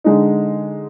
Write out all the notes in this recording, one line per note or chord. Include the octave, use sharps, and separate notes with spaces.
D3 G#3 D#4